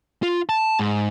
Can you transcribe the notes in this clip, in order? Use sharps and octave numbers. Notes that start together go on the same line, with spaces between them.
F4
A5
G#2